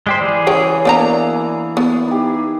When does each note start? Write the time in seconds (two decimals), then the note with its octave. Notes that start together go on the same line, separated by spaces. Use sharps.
0.07 G#3 G4 C5 D5 A#5
0.21 E3 G#4
0.47 C#3 C#4 G5
0.85 A#3 B3 D4 F#4 D5 A#5
1.77 B3
2.08 D#4 G4